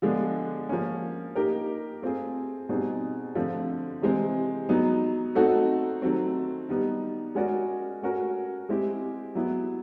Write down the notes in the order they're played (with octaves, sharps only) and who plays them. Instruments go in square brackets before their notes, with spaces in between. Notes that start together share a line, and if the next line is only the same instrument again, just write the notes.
[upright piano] D3 F3 G#3 B3 D4
F3 A#3 C#4
A#3 D#4 G4 A#4
A3 C4 F4 G#4
B2 G3 C4 D#4 G#4
D3 F3 A3 C4
C3 E3 G#3 C4
F#3 B3 D#4
A3 C4 D#4 F#4 A4
D#3 F#3 A3 C4
D#3 G3 B3 D#4
G#3 C#4 F#4 A#4 D5
A3 C#4 F#4 A#4
G#3 C4 E4 G4
F#3 B3 E4